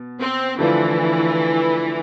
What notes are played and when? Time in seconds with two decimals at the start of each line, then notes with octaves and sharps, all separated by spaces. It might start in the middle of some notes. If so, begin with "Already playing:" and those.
Already playing: B2
0.20 C4
0.59 D3 E3 F3 A3 D4 F4